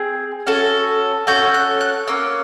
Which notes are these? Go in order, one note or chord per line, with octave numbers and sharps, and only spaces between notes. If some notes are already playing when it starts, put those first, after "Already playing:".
Already playing: C4 G#4
C#4 F#4 A4
C#4 F#4 A4 G6
F#6
F#6
A#3 C#4 E6